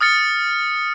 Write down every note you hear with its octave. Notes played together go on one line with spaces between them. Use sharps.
D#6 F6 A6 C#7